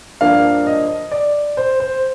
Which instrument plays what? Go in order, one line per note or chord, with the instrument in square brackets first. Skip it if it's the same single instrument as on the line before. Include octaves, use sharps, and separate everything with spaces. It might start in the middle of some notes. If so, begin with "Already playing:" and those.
[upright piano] G2 F3 A#3 D4 F5
D#5
D5
C5
C5